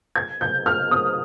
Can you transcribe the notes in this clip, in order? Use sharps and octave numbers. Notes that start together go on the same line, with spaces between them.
G#6
G6
F6
D#6